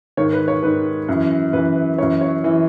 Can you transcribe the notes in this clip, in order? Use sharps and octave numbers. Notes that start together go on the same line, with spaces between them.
G#2 D#3 C#5
B4
C#5
G#2 D#3 B4
F#2 E3
F#2 E3 B4
B4
F#2 E3 C#5
C#5
E3